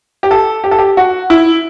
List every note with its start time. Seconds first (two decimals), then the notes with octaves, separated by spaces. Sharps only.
0.23 G4
0.31 A4
0.64 G4
0.71 A4
0.79 G4
0.97 F#4
1.30 E4